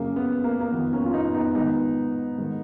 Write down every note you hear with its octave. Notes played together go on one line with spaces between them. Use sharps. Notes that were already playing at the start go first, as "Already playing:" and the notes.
Already playing: F#2 C#3 A#3
B3
A#3
A#3
F2 D#3 B3
A#3 C#4
F4
B3 D#4
B3 D#4
G#2 D#3 B3 D#4
G#2 D#3